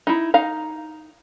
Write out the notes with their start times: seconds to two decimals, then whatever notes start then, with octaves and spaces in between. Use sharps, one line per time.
0.07 D#4 E4
0.34 D#4 F5 A#5